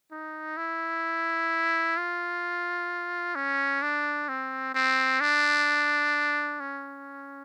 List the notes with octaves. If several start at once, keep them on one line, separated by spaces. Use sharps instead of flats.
D#4
E4
F4
C#4
D4
C4
C4
D4
C#4